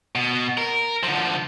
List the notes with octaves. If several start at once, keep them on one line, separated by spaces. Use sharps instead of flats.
B2
A#4
D3 F3